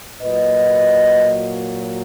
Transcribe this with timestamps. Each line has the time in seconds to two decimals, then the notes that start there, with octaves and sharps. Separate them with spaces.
0.22 A#2 F#3 B4 D#5